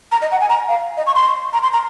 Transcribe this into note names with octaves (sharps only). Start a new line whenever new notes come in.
A#5
D#5
F#5
G#5
A#5
F5
D#5
C#6
C6
A#5
C6
A#5